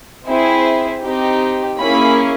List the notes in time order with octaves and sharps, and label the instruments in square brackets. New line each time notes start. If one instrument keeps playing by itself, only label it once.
[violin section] C4 E4 G#4
C4 D#4 G4
A#3 C#4 E4 G#4 B5